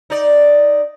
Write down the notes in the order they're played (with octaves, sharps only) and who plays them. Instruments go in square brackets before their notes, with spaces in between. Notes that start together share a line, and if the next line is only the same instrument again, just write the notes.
[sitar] D#4 D5